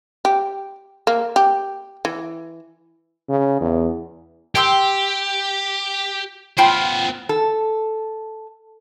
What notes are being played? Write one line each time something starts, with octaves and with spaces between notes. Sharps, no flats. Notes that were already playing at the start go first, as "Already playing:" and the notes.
G4
A#3
G4
E3
C#3
E2
G4 G5 C6 E6
B3 F4 C5 G5 B5
A4